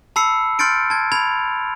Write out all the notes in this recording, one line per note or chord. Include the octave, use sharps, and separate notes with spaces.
A5 B5 E6 C7 C#7
C6 F6 G6 A6 C#7 D7
A5 G#6
B5 G#6 F7